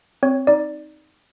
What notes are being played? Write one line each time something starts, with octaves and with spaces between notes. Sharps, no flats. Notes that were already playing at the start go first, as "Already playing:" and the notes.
C4 C#5
D#4 D5